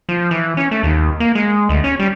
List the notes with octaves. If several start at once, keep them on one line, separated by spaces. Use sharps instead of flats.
F3
E3
C#4
A3
D#2
A#3
G#3
D2
C#4
G3